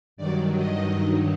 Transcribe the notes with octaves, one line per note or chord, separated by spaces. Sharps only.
G2 D#3 F#3 D5
D#5